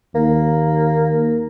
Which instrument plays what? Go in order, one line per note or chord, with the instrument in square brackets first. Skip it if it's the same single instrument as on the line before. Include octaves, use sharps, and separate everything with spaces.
[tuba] D#2 [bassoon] A#3